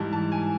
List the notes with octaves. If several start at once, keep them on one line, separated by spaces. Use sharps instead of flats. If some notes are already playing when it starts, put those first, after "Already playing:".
Already playing: G#2 E3 G3 A5
A5
G#5